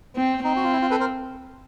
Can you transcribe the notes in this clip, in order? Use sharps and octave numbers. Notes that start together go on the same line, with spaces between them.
C4
C4 D#4
F#4
F4
E4
F4
A4 B4
A#4 C5